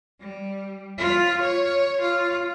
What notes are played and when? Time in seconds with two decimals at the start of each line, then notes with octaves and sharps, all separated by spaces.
0.20 G3
0.98 F4
1.41 C#5
2.01 F4